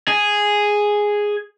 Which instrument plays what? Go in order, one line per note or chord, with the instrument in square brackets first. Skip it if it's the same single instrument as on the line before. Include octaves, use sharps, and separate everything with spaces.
[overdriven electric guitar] G#4